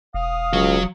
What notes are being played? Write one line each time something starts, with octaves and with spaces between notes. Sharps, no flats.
E1 F5 D#6
C#2 F#3 F#4